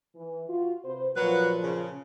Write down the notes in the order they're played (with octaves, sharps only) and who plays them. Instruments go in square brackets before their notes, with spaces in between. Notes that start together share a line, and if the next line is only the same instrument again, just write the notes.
[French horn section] E3
F4 F#4
C3 B4 C5
[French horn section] A#2 F3 [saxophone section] F#3 F#4 B4
[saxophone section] C#3